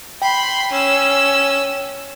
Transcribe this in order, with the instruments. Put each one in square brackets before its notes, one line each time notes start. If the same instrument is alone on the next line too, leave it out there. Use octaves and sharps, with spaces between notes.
[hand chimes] G5 [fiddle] B5 C6
[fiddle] C#4 E6